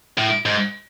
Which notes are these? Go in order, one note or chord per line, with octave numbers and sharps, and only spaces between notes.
A2
G#2